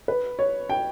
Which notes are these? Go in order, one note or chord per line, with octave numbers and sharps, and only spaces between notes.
B4
C#5
G5